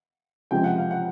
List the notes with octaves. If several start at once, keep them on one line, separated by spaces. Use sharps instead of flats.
C#2 C3 F3 G#3 G5
F#5
F5
F#5